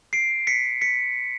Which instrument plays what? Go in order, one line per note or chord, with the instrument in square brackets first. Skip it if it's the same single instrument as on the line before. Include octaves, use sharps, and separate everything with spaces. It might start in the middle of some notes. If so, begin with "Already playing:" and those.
[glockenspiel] C7 D7
B6 C#7
B6 C#7